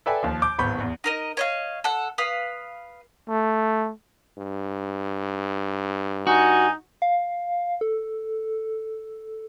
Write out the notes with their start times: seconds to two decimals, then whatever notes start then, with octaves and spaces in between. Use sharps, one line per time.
0.06 A4 B4 D5 E5 G5 G#5
0.23 D#2 F3
0.42 D6 G6
0.58 D1 G#1 B3 B5 C#6 G6
0.80 E2
1.04 D#4 A#4 D#5
1.37 C#5 D#5 F5
1.84 A4 F#5
2.18 B4 F5 D#6
3.28 A3
4.38 G2
6.27 D#4 F#4 G#5
7.02 F5
7.81 A4